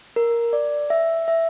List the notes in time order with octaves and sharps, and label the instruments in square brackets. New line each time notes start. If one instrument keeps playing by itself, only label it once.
[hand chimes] A#4
D5
E5
E5